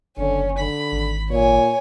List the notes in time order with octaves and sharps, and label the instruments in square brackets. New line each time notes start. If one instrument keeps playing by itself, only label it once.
[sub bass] F#1 [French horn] D3 [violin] C#4
[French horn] D3 [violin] B5
[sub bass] G#1
[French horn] A#2 [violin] C#5 G#5